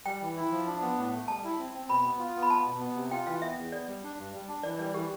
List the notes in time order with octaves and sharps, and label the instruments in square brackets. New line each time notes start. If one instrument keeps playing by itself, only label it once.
[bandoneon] G3 [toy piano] G5
[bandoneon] E3
E4
F3
D4
B3
A2
A3
[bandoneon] G3 [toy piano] A5
[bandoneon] E4
C4
C4
[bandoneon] B2 [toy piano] B5
[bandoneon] B3
F4
B3
[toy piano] B5
[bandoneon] B3 [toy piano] A5
[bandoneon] B2
B3
C3
[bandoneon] F4 [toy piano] G5
[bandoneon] E3 [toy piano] F5
[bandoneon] B3 [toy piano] E5
[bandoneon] E2
[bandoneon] B3 [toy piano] D5
[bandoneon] G3
D4
G2
G3
D4
[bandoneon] E3 [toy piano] D5
[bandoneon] G3 [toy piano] D5
[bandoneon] E3 [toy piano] G4